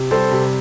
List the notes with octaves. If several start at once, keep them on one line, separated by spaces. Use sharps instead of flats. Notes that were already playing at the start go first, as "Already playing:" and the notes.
Already playing: C3
G3 A4 C5
C3